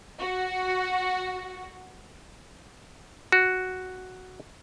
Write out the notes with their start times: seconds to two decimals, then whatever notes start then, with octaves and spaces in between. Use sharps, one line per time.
0.18 F#4 F#5
3.32 F#4